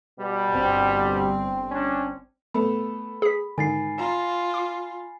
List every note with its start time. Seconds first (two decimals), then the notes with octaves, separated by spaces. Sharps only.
0.19 B2 G3
0.53 G1 C4
1.72 C#4 D4
2.54 A3 B3 A4 B5
3.22 G#4 B6
3.58 G#2 D3 D#3 G#5 A6 C7
3.99 F4 A#5
4.54 D6